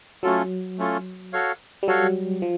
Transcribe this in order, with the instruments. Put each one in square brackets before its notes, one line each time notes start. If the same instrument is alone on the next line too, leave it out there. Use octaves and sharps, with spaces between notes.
[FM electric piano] F#3 [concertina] A3 C#4 F4 A4
[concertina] A3 C#4 F4 A4
F#4 A4 C#5 F5
[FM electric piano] G3
[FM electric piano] F#3 [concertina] F#4 A4 C#5 F5
[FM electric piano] F3